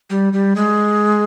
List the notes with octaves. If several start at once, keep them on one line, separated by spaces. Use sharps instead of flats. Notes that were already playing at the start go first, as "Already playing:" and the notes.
G3
G3
G#3